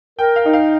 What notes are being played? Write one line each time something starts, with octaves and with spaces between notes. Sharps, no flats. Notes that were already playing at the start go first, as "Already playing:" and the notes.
A#4 G5
F5
D#4
F5